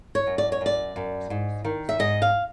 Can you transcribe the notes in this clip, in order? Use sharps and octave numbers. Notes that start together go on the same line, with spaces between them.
C#5
F#2
D5
C#5
F#2 D5
F#2
G#2
D#3
E5
G#2 D#5
F5